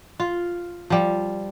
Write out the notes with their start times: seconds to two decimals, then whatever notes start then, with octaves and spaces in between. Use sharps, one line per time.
0.20 F4
0.90 F3 G3